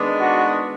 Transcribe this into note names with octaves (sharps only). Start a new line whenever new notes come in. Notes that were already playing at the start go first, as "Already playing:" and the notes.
Already playing: D#3 G#3 B3 D4
F#4